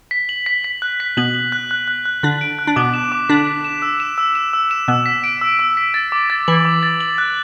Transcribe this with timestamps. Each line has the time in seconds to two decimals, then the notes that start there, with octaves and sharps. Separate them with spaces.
0.11 B6
0.29 F#7
0.46 B6
0.64 B6
0.82 F#6
1.00 B6
1.17 B2 B3 F#7
1.35 F#7
1.52 F#6
1.71 F#6
1.88 F#6
2.05 F#6
2.23 D3 D4 F#6
2.41 D7
2.59 F#6
2.67 D4
2.76 B2 B3 D6
2.94 E7
3.12 D6
3.29 D3 D4 B6
3.47 B6
3.65 E7
3.82 E6
4.00 E7
4.18 E6
4.35 E7
4.53 E6
4.71 E7
4.88 B2 B3 E6
5.06 B6
5.24 D7
5.41 E6
5.59 E6
5.77 B6
5.94 A6
6.12 D6
6.30 A6
6.48 E3 F#7
6.65 D6
6.83 A6
7.01 F#7
7.18 F#6